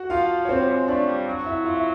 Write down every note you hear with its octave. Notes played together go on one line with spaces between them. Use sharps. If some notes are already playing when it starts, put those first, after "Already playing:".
Already playing: F#4 F#5
F3 F4 F5
C#5
C4 C5
G3
G#3
G#3
A3 D4 D5
G3
F#3
E4 E5
F4 F5
E5